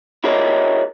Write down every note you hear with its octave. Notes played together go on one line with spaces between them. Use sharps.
E4 F#4 G#4 A#4 C#5 D#5